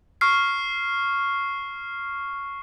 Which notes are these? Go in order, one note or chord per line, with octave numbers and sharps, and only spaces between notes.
C#6 F6 C7